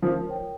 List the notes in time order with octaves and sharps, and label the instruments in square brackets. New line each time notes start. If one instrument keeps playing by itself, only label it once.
[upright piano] F3 [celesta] A#4
[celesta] C#5 G5